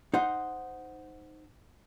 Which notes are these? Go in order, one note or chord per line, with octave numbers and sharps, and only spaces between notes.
D#4 C5 F#5